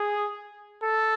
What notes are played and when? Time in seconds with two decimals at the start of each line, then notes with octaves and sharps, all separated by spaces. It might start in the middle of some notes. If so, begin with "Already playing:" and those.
Already playing: G#4
0.83 A4